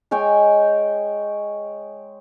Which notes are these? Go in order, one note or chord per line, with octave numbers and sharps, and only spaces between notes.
G#3 C#5 G5 G#5